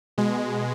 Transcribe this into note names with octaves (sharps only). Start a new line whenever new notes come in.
B2 G#3